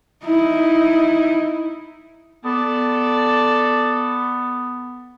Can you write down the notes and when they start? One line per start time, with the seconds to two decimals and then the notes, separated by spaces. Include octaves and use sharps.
0.24 D#4 E4
2.45 B3 A4 D5